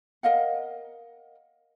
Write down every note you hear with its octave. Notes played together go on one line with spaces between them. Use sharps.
A#4 D#5 F5 F#5